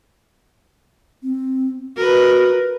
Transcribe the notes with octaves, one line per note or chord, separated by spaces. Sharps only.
C4
F#4 A#4 B4